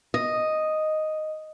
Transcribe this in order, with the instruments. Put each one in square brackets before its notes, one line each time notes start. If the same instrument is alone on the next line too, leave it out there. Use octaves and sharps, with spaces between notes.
[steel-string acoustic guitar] D#5